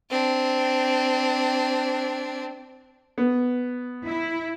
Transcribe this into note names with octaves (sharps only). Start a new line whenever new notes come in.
C4 D4
B3
E4